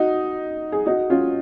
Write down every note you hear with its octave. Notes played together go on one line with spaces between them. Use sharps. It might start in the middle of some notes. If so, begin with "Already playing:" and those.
Already playing: D#4 F#4
G#4
D#4 F#4
C#4 F4